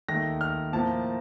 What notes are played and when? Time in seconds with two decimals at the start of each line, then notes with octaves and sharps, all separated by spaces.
0.08 D#2 D#3 A3 A#6
0.41 F6
0.73 A2 F3 A#3 A5